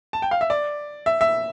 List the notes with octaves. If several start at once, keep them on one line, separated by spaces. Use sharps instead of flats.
A5
G5
F5
E5
D5
E5
E5